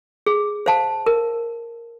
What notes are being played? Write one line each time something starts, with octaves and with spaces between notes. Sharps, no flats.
G#4
C5 F5 A5
A#4